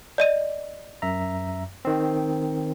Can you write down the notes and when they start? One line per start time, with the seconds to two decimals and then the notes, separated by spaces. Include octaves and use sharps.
0.18 D5 D#5 D#7
1.02 F#2 E5 A#5
1.85 D#3 C4